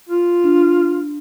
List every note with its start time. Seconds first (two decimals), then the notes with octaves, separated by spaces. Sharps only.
0.09 F4
0.44 D4